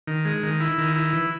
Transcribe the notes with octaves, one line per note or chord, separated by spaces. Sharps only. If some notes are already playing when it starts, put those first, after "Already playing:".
D#3
G#3
D#3
E4
D#3
E4
E3